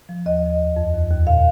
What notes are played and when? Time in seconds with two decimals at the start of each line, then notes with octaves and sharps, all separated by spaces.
0.09 F3
0.26 D#2 D#5
0.43 D#2
0.59 F2
0.77 F2
0.94 D#2
1.11 D#2
1.27 A#2 F5